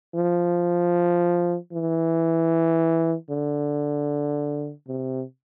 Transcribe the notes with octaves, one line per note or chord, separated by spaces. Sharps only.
F3
E3
D3
C3